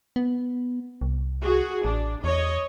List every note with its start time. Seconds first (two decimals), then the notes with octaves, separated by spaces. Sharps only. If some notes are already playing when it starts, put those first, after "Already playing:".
0.16 B3
1.01 C2
1.43 F#4 G#4
1.85 A1 D4
2.24 E2 C#5 D#5